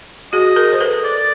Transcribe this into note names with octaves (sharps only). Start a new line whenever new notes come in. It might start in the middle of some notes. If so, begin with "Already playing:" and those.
F#4 G#4 D#5
G#4 A#4
C5
A4 B4
D5